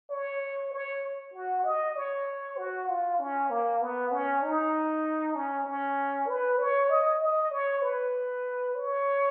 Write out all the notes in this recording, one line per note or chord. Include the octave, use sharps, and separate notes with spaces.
C#5
C#5
F#4
D#5
C#5
F#4
F4
C#4
A#3
B3
C#4
D#4
C#4
C#4
B4
C#5
D#5
D#5
C#5
B4
C#5